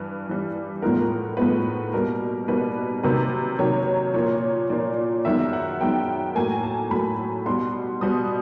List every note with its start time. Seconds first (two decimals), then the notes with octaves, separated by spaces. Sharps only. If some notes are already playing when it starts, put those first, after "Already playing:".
Already playing: G2 E3 B4
0.27 G2 E3 G3
0.82 A2 F3 G#3 B3 A#4
1.00 A#4
1.37 A2 F3 G#3 B3 B4
1.93 B2 G3 A#3 A#4
2.48 B2 G3 A#3 B4
3.03 C3 D#3 F#3 A#3 B4
3.59 C3 D#3 F#3 A#3 C#5
4.14 A#2 F3 A#3 C#5
4.70 A#2 F3 A#3 D5
5.25 F#2 D#3 G#3 B3 E5
5.53 F#5
5.81 F#2 D#3 G#3 B3 G5
6.35 A2 F#3 A#3 G#5
6.63 A5
6.91 A2 F#3 A#3 B5
7.46 B2 G3 B3 C6
8.01 B2 G3 B3 D#6